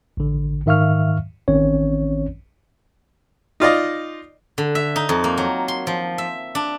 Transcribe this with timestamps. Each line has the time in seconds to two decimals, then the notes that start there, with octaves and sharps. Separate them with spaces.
0.17 A1 D3
0.66 G#2 D#3 E5 F5 C#6 F6
1.48 A1 D#3 C4 C#4 C#5
3.60 D#4 F4 D5 D#5
4.58 D3
4.75 E5
4.96 D#4
5.09 F2
5.24 A#3
5.38 F#3
5.68 C6
5.87 F3
6.18 E5
6.55 D4